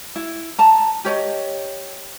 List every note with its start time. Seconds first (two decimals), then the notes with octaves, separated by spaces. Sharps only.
0.16 E4
0.59 A5 A#5
1.05 G4 C#5 D#5